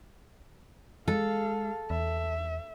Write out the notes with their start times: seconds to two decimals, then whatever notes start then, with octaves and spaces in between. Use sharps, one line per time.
1.08 G#3 G#4 A4 F5
1.90 E2 E5